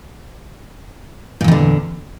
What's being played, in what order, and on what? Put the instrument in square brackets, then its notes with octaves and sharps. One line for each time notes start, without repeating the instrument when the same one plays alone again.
[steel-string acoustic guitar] A#2
E2
D#3
D3